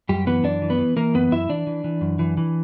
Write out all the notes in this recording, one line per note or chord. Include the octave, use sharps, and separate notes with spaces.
F#2 G3 G4
E3 B3 B4
F#2 D4 D5
E3
B3 B4
E3
E3 A#3 A#4
F#2 B3 B4
F#2 E4 E5
E3 D4 D5
E3
E3
F#2
E3
E3